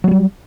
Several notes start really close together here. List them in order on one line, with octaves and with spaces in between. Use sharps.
F#3 A3 G3